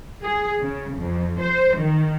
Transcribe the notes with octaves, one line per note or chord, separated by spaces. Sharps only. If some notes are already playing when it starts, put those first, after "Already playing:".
G#4
C#3
F2
C5
D#3